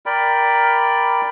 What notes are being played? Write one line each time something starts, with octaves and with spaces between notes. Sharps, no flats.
A#4 D5 G5 B5